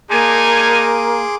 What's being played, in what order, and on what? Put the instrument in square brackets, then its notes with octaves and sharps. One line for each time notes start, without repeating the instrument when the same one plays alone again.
[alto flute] A#3 [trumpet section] D4 D#4 G#5 [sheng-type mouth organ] G#4 C6 D6